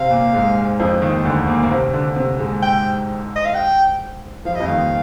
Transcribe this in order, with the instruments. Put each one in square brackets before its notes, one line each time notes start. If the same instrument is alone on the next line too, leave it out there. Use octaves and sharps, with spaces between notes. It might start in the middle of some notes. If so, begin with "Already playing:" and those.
Already playing: [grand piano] C3 C4 [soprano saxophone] F5
[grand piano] A#2 A#3
G#2 G#3
F2 F3
D#2 D#3
D2 D3
A#2 A#3
A#3
C3 C4
D3 D4
C3 C4
G#2 G#3
[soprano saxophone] G5
D#5
F5
G5
[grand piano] F3 [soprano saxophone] F5
[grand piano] G3
[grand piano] F2 F3 [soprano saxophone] D#5
[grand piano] D#2 D#3 [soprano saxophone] F5